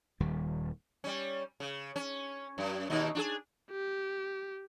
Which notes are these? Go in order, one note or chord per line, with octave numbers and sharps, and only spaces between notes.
D#1 D#2 D#3 G3
G3 C#4
C#3
C#4
F#2
D#2 B2 D#4
D4 F4 G#4
G4